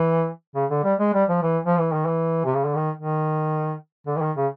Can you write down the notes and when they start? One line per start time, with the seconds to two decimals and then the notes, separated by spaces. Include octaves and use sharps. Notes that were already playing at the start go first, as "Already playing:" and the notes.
Already playing: E3
0.55 C#3
0.70 D3
0.84 G3
0.99 G#3
1.14 G3
1.29 F3
1.43 E3
1.65 F3
1.79 E3
1.93 D#3
2.06 E3
2.45 C3
2.54 C#3
2.65 D3
2.75 D#3
2.97 D#3
4.07 D3
4.16 E3
4.21 D#3
4.37 C#3